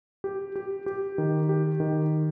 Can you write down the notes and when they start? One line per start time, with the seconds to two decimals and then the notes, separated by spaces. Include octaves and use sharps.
0.24 G4
0.56 G4
0.86 G4
1.18 D#3
1.49 G4
1.80 D#3